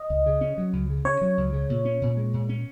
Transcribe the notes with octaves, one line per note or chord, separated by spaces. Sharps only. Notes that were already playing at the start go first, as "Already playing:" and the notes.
Already playing: D#5
C#2
C#3
C#4
F#3
C#2
C#3
C#4 C#5
F#3
C#2
C#3
A#2
C#4
A#2
G#3
A#2
C#4